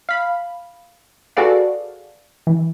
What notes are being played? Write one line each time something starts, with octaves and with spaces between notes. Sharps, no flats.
F5 B5
F#4 G#4 A4 B4 D5 F5
E3